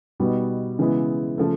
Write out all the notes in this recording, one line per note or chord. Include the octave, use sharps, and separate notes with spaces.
B2 G3 B3 D#4 F#4
C#3 E3 G#3 B3 E4
C#3 F3 A3